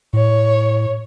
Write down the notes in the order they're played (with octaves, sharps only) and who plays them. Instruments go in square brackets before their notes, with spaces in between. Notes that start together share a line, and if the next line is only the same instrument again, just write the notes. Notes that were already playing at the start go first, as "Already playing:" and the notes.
[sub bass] A2 [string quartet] C#5